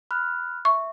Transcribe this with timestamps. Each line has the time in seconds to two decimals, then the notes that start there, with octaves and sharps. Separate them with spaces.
0.11 B5 F6 F#6
0.65 E5 C#6